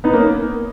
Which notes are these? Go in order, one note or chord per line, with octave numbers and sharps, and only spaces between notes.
B3 D#4
A#3 C#4